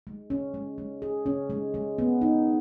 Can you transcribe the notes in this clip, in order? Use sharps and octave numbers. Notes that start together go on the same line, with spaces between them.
G#3
C#4
G#3
G#3
G#4
C#4
G#3
G#3
B3
D#4